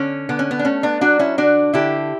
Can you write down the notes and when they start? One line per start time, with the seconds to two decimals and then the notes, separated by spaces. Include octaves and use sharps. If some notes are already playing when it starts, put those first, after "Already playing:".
Already playing: D3 C#4
0.29 D3 B3
0.39 C#4
0.51 B3
0.59 D4
0.65 A3 C#4
0.83 B3 D4
1.01 F#3 D4 F#4
1.19 C#4 E4
1.38 D3 D4 F#4
1.74 D3 E4 G4